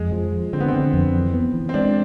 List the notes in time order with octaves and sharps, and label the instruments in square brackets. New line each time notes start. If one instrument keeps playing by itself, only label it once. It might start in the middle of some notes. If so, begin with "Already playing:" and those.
Already playing: [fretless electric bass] F2 [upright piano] G#3
[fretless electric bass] F3
F3
[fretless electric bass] D3 [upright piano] C4
[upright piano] B3
[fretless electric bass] D3 [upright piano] C4
[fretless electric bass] F2
E3
B3
E3
[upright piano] C4
[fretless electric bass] G#3 [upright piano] D4